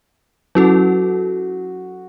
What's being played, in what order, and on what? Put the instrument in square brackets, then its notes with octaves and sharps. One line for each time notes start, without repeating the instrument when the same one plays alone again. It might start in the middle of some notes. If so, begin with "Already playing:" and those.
[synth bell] F#3 C#4 E4 A4 [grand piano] F#4